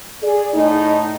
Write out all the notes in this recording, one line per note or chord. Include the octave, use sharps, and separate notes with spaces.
G#4 D5
A2 D#4